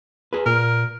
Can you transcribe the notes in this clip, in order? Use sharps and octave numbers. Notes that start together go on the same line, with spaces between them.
G#4 B4
A#2 A#4